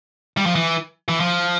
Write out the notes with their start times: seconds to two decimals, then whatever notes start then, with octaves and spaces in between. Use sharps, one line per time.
0.37 G3
0.46 F3
0.55 E3
1.09 E3
1.20 F3